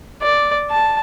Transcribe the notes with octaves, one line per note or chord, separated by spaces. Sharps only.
D5
A5